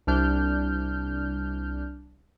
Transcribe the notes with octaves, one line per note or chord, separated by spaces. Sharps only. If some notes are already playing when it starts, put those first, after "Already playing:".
C2 D4 F6 G6